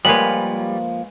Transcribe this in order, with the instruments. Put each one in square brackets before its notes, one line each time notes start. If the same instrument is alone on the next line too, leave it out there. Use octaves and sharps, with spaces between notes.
[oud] F3 A#3 [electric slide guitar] G3 [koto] G#3 B4 C#5 [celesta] F#7